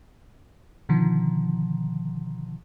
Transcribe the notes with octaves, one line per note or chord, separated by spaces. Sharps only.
B2 D3 D#3 F3